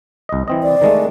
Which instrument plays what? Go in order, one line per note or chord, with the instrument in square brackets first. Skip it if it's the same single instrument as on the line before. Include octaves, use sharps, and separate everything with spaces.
[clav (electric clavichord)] C2 D#5
E3 C4 D#5
[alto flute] D5
[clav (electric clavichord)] D#3 G#3 A3